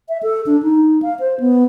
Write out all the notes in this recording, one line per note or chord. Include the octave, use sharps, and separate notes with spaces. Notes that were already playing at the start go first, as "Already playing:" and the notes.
E5
A4
D4
D#4
F5
C5
B3